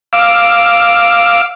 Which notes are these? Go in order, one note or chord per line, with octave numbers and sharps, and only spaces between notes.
F5 D6 E6